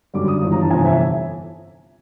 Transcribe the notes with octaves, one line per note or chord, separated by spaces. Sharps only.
F#2 D3 G3 D6
D#6
G1 G2 E3
A#5
A5
G1 F2 C3 E3 G#5
E5